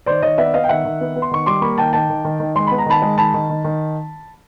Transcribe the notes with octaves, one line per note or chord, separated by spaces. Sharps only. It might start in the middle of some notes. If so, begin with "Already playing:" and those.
D#3 C5 D5
D#3 C#5 D#5
B3 D5 E5
B3 D#5 F5
G5
D#3 E5 F#5
D#3
B3
B3
C6
D#3 C#6
G3 C6 D6
A#3 B5 C#6
D#3 G5 A5
D#3 G5 A5
D#3
D#3
D#3
G#3 C6
B3 B5
A#5
D#3 A5 B5
G#3
D#3 A5 B5
D#3
D#3
D#3